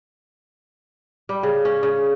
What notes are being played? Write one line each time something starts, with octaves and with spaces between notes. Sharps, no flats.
G3
C#3
C#4
C#3